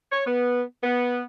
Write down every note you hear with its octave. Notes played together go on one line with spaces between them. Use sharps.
C#5
B3
B3